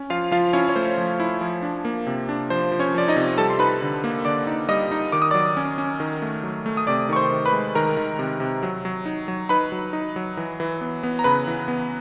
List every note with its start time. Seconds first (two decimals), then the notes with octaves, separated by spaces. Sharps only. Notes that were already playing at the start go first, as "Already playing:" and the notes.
Already playing: C#4
0.10 F3 F4 F5
0.31 F3 F4 F5
0.53 C#4 E4 C#5
0.69 C#5
0.76 A3 C5
0.98 F3
1.20 E4
1.41 F3
1.62 D4
1.85 A#3
2.07 C3
2.29 D4
2.50 F3 C5
2.72 F3
2.79 C#4 C#5
2.94 F3 D5
3.08 D#4 D#5
3.16 C3
3.37 G3 A4 A5
3.50 C6
3.59 D#4 B4 B5
3.82 D3
4.04 A#3
4.25 D3 D5 D6
4.47 D#4
4.69 G3 D#5 D#6
4.91 D#4
5.12 D#3 D6
5.22 D#6
5.31 F#3 D5 D6
5.57 C#4
5.78 C#4
6.00 D#3
6.22 A3
6.43 F#3
6.66 A3
6.77 D#6
6.87 C3 D5 D6
7.09 D#3 C#6
7.16 C5 C6
7.31 D#3
7.46 B4 B5
7.53 G#3
7.75 D#3 A#4 A#5
7.97 D#3
8.19 C3
8.40 C3
8.63 F#3
8.85 F#3
9.06 D#4
9.28 F#3
9.49 D#4 B4 B5
9.72 F#3
9.93 D#4
10.16 F#3
10.37 E3
10.60 E3
10.81 B3
11.03 B3
11.19 A#5
11.24 C#3 B4 B5
11.47 E3
11.68 B3